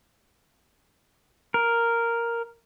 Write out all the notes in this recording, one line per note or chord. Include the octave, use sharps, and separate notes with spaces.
A#4